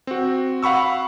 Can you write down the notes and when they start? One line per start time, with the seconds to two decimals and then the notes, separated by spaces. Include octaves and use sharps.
0.07 C4 F#4
0.63 F5 F#5 B5 C#6 E6